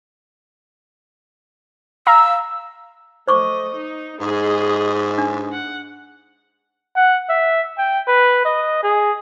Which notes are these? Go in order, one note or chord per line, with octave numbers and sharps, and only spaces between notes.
F5 A#5 E6
A3 C5 D#5 C#6 D6
D#4
G#2 G#4 D#5
D4
F#5
F#5
E5
G5
B4
D#5
G#4